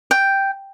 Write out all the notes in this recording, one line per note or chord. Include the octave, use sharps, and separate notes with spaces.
G5